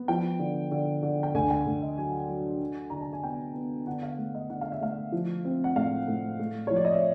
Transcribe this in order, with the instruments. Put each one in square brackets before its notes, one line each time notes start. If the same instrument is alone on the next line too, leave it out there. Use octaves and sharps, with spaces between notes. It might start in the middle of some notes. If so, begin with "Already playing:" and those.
Already playing: [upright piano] B3
F3 G5
D3
D3
D3
G5
D2 G#5
G5
D2
D#5
F#3 G#5
F#3
F#3
D3 A#5
A5
G#5
B3 G5
B3
D3 F#5
F5
A3
D#5
D3 F#5
F5
E5
A3 F5
F3
C4
F#5
A2 F5
A2
A3
F3 C#5
D5
D#5
E5